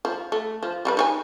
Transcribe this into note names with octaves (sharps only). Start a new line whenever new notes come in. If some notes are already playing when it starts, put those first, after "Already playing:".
F3
A3
F3
G3 F#4 B4
D#4 C#5 G#5